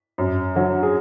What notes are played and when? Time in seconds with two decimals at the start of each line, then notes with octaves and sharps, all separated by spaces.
0.18 F#2
0.55 D3 F#3
0.83 G#4